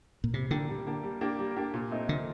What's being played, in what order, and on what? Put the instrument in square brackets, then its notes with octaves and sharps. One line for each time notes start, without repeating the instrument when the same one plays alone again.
[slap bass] A#2
[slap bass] C3 [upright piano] G3
[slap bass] D3 [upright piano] A#3 D4 G4
[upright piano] G3
A#3 D4 G4
G3
A#3 D4 G4
G3
A#3 D4 G4
A#2
A3 C4 D#4
[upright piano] A#2 [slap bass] D3